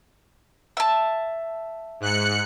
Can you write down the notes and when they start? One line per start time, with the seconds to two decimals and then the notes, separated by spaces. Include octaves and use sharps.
0.77 E5 A5
2.00 G#2 F#6 C#7